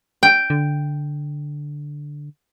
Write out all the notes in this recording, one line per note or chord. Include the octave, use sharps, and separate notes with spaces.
G5
D3